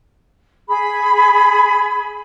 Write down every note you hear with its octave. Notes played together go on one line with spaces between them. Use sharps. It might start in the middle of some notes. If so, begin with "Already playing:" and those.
G#4 B5